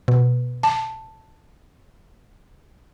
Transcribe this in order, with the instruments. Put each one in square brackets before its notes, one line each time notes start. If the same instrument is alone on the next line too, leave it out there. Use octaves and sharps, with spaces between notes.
[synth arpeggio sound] B2
[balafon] A5